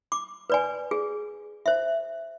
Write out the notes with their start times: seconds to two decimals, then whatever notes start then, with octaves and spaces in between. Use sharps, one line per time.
0.12 D6
0.50 B4 D5 G#5
0.91 G#4
1.66 C5 E5